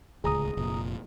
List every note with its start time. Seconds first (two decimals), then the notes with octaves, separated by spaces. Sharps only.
0.24 D1 C#2 G#4 A#5 D#6
0.57 F1 A#2